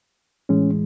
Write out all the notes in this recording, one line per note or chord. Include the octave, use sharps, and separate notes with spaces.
A2 E3 G#3 C#4